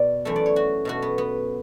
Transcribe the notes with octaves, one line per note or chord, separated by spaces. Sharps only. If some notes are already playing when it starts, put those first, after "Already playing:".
Already playing: B2 D5
F#2 E3 A3 E5
D5
C#5
F#4
B2 A3 F#4
B3
B3